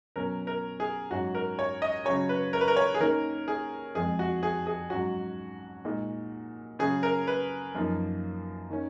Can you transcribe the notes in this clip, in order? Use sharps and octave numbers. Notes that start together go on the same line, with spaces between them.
B2 F#3 C#4 A#4
A#4
G#4
G#2 F#3 C#4 F#4
A#4
C#5
D#5
C#3 F#3 C#4 C#5
B4
A#4
B4
A#4
C#5
G#4
D#3 A#3 C#4 A#4
G#4
F2 F3 G#3 G#4
F#4
G#4
G#4
G#2 F#3 C#4 F#4
A#2 G#3 D#4
C#3 F#3 C#4 G#4
A#4
B4
F#2 F3 A#3 D#4
D#3 A#3 C#4